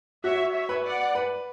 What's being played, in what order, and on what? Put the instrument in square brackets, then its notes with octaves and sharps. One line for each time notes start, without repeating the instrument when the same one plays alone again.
[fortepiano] F#4 [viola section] C#5 E5
[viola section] C#5 E5
[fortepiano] B4
[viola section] D5 F#5
[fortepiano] B4